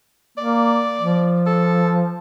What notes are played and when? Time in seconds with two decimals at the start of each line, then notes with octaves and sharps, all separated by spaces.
0.38 A#3 D5
1.00 F3
1.46 A4